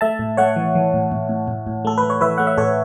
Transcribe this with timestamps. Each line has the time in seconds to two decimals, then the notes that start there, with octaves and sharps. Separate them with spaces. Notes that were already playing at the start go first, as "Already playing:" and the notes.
0.01 A3 E5 A5
0.19 A2
0.37 A3 C#5 F#5
0.56 E3
0.75 E3
0.94 A2
1.12 A2
1.29 A2
1.48 A2
1.67 A2
1.85 A3 A4
1.98 B4
2.03 A3
2.10 C#5
2.21 E3 B4 E5
2.38 A3 F#5
2.47 E5
2.58 A2 A4 C#5